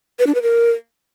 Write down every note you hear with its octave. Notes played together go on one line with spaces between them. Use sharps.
B4
D4
B4
A#4